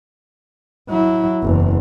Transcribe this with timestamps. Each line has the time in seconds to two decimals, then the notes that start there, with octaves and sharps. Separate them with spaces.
0.90 F#3 E4
1.42 F#1 E2